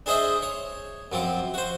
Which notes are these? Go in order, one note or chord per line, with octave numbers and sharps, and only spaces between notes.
D4 G#4 C5 D#5 E5
C#5
F#2 F3 C4
F#4 C5